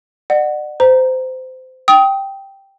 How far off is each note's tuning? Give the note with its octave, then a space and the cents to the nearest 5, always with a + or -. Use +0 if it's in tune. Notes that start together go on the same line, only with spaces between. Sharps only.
D5 +40 F#5 +0
C5 -20 A#5 +0
G5 +0 D#6 +25